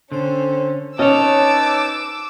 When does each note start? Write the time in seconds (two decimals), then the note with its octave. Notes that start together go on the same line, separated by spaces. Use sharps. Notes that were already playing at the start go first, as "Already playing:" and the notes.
0.12 D3 C4 C#4 A4 C5
0.99 C#4 D#4 B4 C#5 D#5 A5 D6 E6